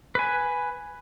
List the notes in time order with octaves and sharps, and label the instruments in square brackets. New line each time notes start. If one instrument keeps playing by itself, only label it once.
[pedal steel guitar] B4 G#5